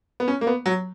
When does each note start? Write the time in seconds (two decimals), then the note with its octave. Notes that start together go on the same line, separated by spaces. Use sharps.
0.20 B3
0.28 C#4
0.41 A#3
0.47 B3
0.66 F#3